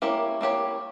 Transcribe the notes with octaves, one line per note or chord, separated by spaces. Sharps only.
A#3 E4 G4 C#5
A#3 E4 G4 C#5